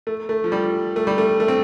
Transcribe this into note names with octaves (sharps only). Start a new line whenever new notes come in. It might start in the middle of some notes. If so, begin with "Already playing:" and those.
A3
A3
F3
G3
A3
G3
A3
A3
C4